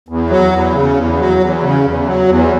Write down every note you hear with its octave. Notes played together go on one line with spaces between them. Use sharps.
E2
F#3
E2
C#3
E2
F#3
E2
C#3
E2
F#3
E2